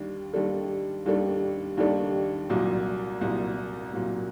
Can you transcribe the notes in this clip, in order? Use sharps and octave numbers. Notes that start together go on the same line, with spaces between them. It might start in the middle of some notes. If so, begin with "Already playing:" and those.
Already playing: D#2 D#3 G3 D4
D#2 D#3 G3 D4 A4
D#2 D#3 G3 D4 A4
D#2 D#3 G3 D4 A4
C2 A#2 F#3
C2 A#2 F#3
C2 A#2 F#3